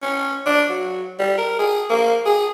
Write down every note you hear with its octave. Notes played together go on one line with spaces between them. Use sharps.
C#4
D4
F#3
G3
A#4
G#4
A#3
G#4